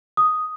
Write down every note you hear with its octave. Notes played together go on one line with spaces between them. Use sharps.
D#6